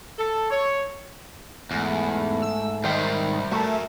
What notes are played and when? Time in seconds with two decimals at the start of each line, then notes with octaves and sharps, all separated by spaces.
0.19 A4
0.51 C#5
1.71 E2 G#2 A3
2.42 E6
2.84 D#3 G3 C5 E5
3.52 A3 F#4 A4 A#4